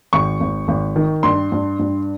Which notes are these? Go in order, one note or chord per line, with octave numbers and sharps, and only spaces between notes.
G#1 C#6
G#1
G#1
D#3
G2 C6
G2
G2